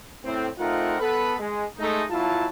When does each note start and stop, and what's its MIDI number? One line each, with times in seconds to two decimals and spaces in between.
0.25 0.47 45
0.25 0.47 60
0.59 0.96 57
0.59 0.96 60
0.59 0.96 63
0.59 0.96 65
0.59 0.96 70
0.59 0.96 78
0.99 1.34 59
0.99 1.34 69
0.99 1.34 71
1.40 1.65 56
1.79 2.03 56
1.79 2.03 57
1.79 2.03 63
2.11 2.48 35
2.11 2.48 54
2.11 2.48 64
2.11 2.48 65
2.11 2.48 81